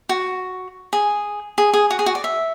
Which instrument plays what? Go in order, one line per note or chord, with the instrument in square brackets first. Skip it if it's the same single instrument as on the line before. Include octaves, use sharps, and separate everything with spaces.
[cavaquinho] F#4
G#4
G#4
G#4
F#4
G#4
F#4
D5
E5